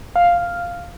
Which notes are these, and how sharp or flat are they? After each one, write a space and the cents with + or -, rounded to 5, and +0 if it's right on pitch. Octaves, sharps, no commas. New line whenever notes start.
F5 +0